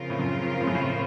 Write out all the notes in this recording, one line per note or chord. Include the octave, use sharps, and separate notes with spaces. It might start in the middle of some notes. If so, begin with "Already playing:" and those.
Already playing: C#3 F3 C4 F4 A#4
A2
F#2
A2
F#2
A2